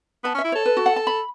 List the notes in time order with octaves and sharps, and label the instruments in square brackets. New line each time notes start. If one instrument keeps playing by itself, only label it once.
[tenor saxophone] B3 [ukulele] A5
[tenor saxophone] C#4
[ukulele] E5
[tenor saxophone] E4
[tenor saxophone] A4 [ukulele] C#5
[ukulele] B4
F#4
F#5
A5
B5